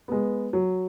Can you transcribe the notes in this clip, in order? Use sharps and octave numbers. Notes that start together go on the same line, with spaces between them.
G#3 B3
F#3